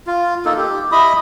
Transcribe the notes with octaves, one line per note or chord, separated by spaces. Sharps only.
F4
A#3 D#4 A4
G4
E4 D#5 B5 D#6